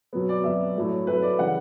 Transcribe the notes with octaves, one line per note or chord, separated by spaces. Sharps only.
B2 F#3 B3
D5
B2 F#3 B3 E5
A2 F#3 A3
A2 F#3 A3 B4
D5
C#3 E3 G3 F#5